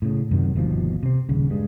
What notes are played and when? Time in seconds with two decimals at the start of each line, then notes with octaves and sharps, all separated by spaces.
0.02 A2 C#3
0.31 F#2 C3 D#3 F#3
0.55 G1 D#2 B2 F3
1.03 C3 C4
1.29 D#1 C#3
1.50 G2 G#3